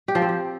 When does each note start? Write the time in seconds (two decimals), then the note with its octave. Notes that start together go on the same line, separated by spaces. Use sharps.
0.08 G4
0.15 F3
0.22 C4
0.29 G4